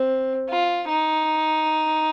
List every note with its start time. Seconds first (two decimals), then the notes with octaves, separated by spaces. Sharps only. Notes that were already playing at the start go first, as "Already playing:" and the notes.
Already playing: C4
0.50 F4
0.89 D#4